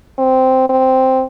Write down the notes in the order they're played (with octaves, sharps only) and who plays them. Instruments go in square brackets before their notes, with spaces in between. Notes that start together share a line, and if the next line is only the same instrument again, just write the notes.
[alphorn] C4
C4